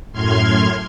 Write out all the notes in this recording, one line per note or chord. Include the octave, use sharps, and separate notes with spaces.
F#2 A2 C6 F6 G#6